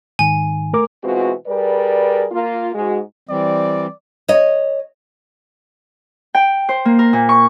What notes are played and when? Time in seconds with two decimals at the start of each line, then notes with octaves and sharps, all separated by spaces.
0.19 G#2 D#3 G#5
0.73 A3 A#4 D6
1.04 B2 E3 G#3 C4 F4 F#4
1.47 G3 G#4 A#4 B4 D5
2.32 A#3 F4
2.75 G#2 G#3 F#4
3.29 E3 G3 C4 D5
4.28 C#5 D#5
6.35 G5
6.69 C5
6.85 A#3
6.99 A#4
7.13 A#2
7.29 C#6